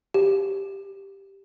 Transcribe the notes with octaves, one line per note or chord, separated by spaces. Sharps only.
G4